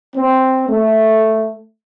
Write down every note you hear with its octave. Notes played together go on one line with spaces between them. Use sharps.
C4
A3